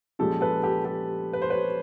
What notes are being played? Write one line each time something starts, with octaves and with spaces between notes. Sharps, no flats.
A#2 F3 G#3 C#4 G4 A4
A4 B4
G4 A4
G4 A4
B4
C5
B4 C#5